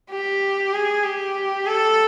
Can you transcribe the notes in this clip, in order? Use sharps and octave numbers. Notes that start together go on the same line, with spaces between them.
G4
G#4
G4
A4